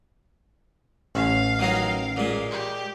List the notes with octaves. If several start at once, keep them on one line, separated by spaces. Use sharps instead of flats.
A1 C#4 F5
D#3 F#3 D#4
A#2 G#3
G4